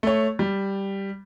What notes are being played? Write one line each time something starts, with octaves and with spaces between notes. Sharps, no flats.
A3 C#5
G3